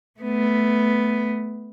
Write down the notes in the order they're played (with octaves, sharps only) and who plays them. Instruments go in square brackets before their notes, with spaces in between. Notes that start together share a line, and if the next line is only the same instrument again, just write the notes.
[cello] A3 B3